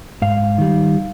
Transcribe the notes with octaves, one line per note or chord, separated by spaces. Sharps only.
G#2 F5
D#3 G3